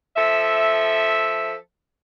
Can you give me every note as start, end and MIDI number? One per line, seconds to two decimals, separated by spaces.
0.16 1.54 53
0.16 1.54 69
0.16 1.54 76